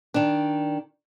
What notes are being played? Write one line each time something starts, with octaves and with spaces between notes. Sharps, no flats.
D#3 D4